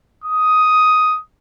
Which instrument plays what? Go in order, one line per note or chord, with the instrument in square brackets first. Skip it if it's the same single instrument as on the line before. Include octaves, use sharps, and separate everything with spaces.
[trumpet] D#6